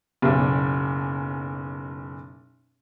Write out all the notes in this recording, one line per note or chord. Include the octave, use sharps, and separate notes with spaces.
F#1 B1